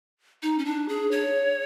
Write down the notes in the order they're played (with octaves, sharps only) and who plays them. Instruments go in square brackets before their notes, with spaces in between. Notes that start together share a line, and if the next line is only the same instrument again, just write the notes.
[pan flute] D#4
C#4
D4
G#4
C#5